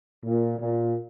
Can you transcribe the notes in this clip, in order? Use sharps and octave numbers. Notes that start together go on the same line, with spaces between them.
A#2
A#2